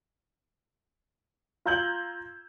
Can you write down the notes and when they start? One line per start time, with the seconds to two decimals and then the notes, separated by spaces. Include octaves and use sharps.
1.65 F4 A#5 E6 G6 G#6 F#7